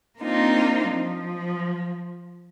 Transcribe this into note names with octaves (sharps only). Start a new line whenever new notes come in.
A#3 C4 D4 D#4 F4
F3